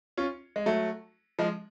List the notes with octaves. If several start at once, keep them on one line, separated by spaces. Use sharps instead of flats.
C#4 F4
G#3
F#3 A3
F3 G#3